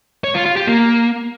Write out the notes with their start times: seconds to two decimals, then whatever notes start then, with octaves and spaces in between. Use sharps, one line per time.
0.24 C#5
0.35 F4
0.46 F4
0.56 G4
0.67 A#3